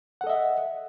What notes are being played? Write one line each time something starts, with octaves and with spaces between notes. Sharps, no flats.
A4 D#5 E5 F#5